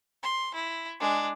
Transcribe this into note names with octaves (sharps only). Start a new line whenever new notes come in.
C6
E4
G#3 D4